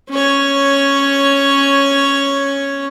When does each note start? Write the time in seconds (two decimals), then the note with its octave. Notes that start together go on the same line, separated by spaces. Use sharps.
0.10 C#4 C#5